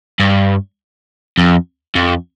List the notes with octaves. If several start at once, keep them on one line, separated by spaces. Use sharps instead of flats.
G2
F2
F2